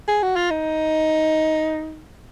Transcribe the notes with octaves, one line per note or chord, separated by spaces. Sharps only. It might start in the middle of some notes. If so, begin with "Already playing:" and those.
G#4
F#4
F4
D#4